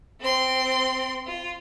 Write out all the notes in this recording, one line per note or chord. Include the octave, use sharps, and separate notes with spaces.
C4 C6
F4